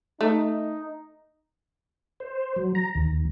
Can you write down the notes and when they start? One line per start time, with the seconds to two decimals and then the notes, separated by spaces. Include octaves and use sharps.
0.21 A3 D#4
2.20 C5
2.56 F#3
2.75 A#5
2.95 D#2